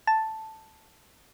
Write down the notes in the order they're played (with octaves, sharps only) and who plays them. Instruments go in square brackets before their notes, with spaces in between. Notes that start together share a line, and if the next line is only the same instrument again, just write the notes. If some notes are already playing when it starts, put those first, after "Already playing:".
[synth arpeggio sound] A5